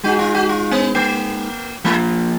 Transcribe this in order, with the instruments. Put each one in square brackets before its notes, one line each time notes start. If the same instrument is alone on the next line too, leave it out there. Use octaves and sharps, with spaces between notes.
[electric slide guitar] G#3 D#4 G#4 [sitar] F#4
[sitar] F4
F#4
F4
B3
A#3
[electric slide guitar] F3 A#3 F4 [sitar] G#3